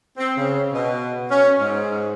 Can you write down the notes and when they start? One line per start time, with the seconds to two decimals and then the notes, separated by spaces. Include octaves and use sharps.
0.18 C4
0.37 C#3
0.73 B2
1.31 C#4
1.60 G#2